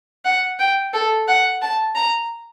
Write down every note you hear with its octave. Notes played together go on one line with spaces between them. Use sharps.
F#5
G5
A4
F#5
A5
A#5